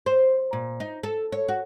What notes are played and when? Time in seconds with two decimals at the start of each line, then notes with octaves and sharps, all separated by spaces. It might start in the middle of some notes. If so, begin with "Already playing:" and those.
0.06 C5
0.53 A#2
0.80 D#4
1.03 A4
1.32 C#5
1.48 F#4